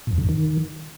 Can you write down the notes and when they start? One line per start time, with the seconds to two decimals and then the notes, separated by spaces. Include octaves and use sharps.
0.07 A#2
0.13 E2
0.18 D3
0.23 G2
0.29 D#3